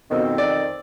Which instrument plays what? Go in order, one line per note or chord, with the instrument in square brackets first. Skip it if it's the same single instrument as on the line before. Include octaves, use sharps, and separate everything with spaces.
[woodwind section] F2 D#3 C4 [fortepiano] B2
[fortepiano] D5